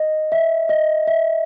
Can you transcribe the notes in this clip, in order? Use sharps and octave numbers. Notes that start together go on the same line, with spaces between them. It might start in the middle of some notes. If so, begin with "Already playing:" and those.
Already playing: D#5
E5
D#5
E5